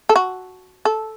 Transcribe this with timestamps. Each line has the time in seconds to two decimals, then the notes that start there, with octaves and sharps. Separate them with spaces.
0.09 A4
0.16 F#4
0.85 A4